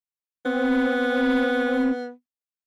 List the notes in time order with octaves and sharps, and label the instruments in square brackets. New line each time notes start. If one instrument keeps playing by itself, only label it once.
[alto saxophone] B3 [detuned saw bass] C4